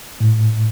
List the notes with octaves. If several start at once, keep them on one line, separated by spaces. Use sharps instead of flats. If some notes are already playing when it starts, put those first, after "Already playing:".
A2